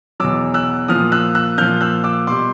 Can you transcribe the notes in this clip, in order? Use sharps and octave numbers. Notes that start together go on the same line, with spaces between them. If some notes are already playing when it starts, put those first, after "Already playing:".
E2 B2 F#3 D6 E6
E6 F#6
A#2 F3 D#6 F6
E6 F#6
E6 F#6
A#2 F3 F6 G6
E6 F#6
D6 E6
B2 G3 C6 D6